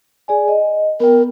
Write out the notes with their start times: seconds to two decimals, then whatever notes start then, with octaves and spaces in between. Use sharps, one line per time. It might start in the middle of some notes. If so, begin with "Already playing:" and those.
0.28 G#4 D5 G#5
0.48 D#5
1.00 B3 A#4 G5